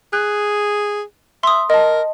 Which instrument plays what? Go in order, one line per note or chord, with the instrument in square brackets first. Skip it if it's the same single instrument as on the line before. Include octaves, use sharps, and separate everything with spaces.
[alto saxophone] G#4 [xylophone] F#6
[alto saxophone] E5 [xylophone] C6 D#6
[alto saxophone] A#4 [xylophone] D#5 A5